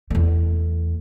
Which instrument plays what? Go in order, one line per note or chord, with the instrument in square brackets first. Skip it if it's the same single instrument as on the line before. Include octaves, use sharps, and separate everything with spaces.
[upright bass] E2 A3